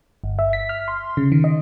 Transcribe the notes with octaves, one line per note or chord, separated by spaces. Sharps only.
G1
E5
B6
F6
C6
C#3
D#3
D#5